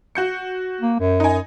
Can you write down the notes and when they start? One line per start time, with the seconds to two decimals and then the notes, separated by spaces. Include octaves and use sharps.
0.15 F#4 G6 C#7
0.81 A#3
1.00 F#2
1.20 D#4 G#5